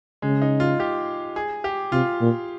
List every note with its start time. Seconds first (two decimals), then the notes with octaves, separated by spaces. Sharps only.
0.22 C#3 G#3
0.42 D#4
0.60 F4
0.80 G4
1.36 G#4
1.64 G4
1.92 C3 F4
2.21 A#2